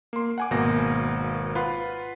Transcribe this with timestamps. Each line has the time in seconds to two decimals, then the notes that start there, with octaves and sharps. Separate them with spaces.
0.13 A#3 C6
0.38 F#5 G#5 D6
0.51 G#1 B2 A#3 A#6
1.55 F4 B4 F#5 B5 C6